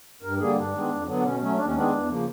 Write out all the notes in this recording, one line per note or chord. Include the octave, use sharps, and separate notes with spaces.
G2 A#4
D3 G3 A#3 G#4
G2 D4
D#3 G#3 B3
F2
D3 F#3 B3
D4
B2 C#4
F#3 A3 C#4
D#2 D4
C#4
D#3 G#3 B3 D4
E2
C#3 F3 A#3